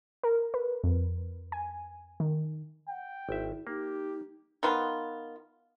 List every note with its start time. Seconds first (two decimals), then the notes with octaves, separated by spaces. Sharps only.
0.23 A#4
0.54 B4
0.84 F2
1.52 G#5
2.20 D#3
2.89 F#5 G5
3.29 G#1 E4 E5
3.67 A#3 D#4 G4
4.63 D#3 B3 F4